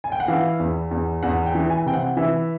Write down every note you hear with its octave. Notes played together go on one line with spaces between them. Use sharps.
G#5
G5
F#5
E3 F5
E2
E2
E2 F#5
G5
E3
G#5
C3 G5
F#5
E3 E5